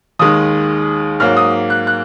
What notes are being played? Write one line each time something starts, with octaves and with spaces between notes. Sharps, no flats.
D#2 D#3 G#3 D#6
G#2 F#3 A#3 F6
D#6
F#6
F#6